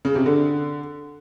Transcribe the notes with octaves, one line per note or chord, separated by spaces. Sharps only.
C#3
C3
D3